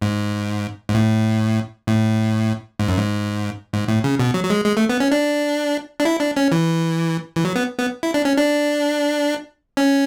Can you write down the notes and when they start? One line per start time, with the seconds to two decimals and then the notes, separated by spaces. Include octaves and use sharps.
0.02 G#2
0.89 G#2
0.94 A2
1.87 A2
2.79 G#2
2.88 F#2
2.98 G#2
3.73 G#2
3.88 A2
4.04 C#3
4.19 B2
4.34 F#3
4.45 F#3
4.50 G#3
4.65 G#3
4.77 A3
4.89 B3
5.00 C#4
5.12 D4
6.00 D4
6.05 E4
6.20 D4
6.37 C#4
6.52 E3
7.36 E3
7.45 F#3
7.56 B3
7.79 B3
8.03 E4
8.14 D4
8.25 C#4
8.37 D4
9.77 C#4